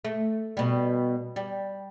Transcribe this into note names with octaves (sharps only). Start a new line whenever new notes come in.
A3
B2 G3
G3